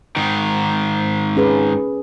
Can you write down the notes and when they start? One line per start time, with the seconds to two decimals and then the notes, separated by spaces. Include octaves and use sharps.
0.16 G#2 D#3
1.36 C#4 G#4 B4